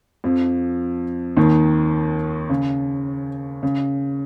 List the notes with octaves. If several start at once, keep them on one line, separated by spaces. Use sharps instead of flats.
F2 F3
D#2 D#3
C#3
C#3